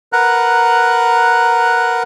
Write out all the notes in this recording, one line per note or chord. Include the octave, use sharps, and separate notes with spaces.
A#4 B4 F#5 A#5 F#6